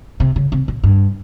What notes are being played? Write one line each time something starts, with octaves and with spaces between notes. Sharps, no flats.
C3
C#3
C3
A#2
G2